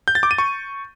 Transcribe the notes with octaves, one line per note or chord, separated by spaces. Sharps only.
G6
A6
D6
D#7
C#6